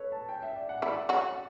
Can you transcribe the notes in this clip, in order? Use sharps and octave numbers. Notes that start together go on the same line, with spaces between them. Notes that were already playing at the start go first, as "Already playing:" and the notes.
Already playing: A4 B4 C#5
A5
G5
E5
D5
F#5
E3 E4 D5
F#3 F#4